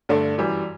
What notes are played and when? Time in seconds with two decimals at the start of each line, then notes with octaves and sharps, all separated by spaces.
0.09 G2 D3 A3 D4
0.38 F#2 E3 G3